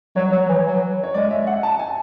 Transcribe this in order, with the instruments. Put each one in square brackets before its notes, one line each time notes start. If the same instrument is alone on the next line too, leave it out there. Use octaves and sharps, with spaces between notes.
[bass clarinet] F#3 [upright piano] C#5
[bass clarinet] F#3
E3
F#3
[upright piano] C#5
[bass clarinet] G#3 [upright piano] D5
[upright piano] E5
F#5
A5
G#5